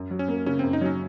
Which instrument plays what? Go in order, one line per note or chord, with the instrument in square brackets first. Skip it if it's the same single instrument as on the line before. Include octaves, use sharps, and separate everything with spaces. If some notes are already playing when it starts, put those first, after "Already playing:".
Already playing: [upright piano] F#2
F#3
[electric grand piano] C#4
[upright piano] A#3
[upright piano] C#3 [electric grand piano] C#4
[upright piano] F#2 [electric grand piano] C4
[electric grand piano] D#4
[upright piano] F#3 [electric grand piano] C#4